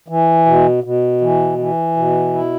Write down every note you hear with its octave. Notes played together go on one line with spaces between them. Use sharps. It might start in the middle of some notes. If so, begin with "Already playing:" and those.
E3
B2
B2
E3
E3
B2
E4